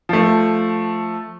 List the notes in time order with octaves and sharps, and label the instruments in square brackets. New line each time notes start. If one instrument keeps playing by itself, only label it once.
[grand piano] F3 A3